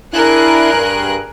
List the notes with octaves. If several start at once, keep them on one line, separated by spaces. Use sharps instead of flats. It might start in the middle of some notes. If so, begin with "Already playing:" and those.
D4 E4 G#4 A#4 F#6
G2